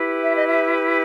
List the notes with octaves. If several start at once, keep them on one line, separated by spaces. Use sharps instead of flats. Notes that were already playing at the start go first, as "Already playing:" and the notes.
Already playing: E4 G4 B4
E5
D#5
E5